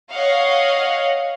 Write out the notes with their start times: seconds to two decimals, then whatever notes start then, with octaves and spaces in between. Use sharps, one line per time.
0.12 C#5 D#5 F5 F#5